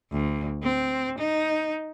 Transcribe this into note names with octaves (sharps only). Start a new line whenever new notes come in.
D2
C4
D#4